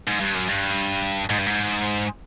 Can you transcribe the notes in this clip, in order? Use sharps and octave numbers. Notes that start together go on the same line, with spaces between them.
G#2
G2
F#2
G2
G#2
G2
G#2